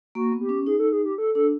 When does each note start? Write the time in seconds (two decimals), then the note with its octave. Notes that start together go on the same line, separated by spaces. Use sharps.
0.15 A#3 F#4
0.32 B3
0.41 G4
0.49 C#4
0.67 D#4 G#4
0.80 A4
0.92 G#4
1.05 G4
1.18 A4
1.35 D4 A4